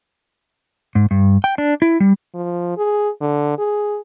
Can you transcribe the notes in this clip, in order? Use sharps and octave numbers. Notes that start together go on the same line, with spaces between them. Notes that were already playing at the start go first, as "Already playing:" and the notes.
G#2
G2
G5
D4
E4
G3
F3
G#4
D3
G#4